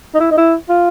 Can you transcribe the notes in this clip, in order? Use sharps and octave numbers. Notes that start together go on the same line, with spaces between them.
D#4
E4
D#4
E4
F4